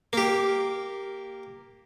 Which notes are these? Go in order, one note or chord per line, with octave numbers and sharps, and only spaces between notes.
A#3 G4